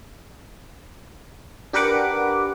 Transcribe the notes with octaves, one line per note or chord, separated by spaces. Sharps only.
D4 G4 A#4 B4 F#5 D6